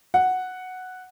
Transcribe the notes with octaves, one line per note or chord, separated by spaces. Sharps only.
F#5